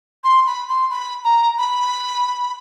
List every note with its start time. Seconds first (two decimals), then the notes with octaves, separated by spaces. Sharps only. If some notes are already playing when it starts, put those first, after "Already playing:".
0.24 C6
0.46 B5
0.69 C6
0.90 B5
1.24 A#5
1.58 B5